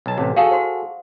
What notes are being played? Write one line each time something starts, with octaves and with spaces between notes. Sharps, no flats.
B1 A5
A1 C3
F#4 G#4 A4 F5
C5 F#5 C6